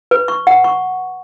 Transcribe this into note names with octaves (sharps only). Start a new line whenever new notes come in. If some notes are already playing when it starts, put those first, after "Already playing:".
B4
C#6
F#5
C#6